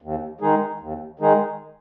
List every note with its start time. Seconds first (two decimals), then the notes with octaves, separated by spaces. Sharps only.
0.02 D#2
0.41 D#3 G#3 D#4 G#4
0.80 D#2
1.19 D#3 G#3 D#4 G#4